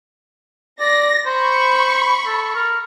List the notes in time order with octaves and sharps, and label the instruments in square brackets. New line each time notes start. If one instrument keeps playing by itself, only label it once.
[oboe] D5 [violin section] A#6
[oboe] C5 [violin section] B5 C#6
[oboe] A4
A#4